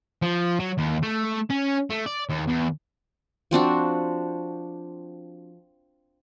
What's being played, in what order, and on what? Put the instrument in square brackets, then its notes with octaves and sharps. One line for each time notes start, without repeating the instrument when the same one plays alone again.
[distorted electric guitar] F3
F#3
D#2
A3
C#4
A3
D5
D#2
E2
[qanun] F3 C4 D4 F#4